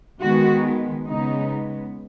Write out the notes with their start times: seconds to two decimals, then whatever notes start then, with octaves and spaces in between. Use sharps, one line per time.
0.21 D#3 G#3 B3 F#4
1.06 C#3 G#3 B3 D#4